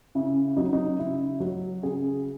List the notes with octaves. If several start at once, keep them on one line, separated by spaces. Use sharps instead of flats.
C#3 E4
F#3 D#4
D#4
C#3 E4
F#3
C#3 G#4